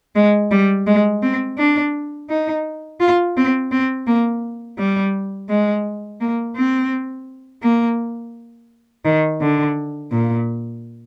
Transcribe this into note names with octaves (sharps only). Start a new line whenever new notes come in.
G#3
G3
G#3
C4
D4
D#4
F4
C4
C4
A#3
G3
G#3
A#3
C4
A#3
D#3
D3
A#2